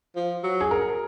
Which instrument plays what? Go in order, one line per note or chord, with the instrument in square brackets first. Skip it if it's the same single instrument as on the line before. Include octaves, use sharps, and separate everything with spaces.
[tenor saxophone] F3
F#3
[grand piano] G#4
A#4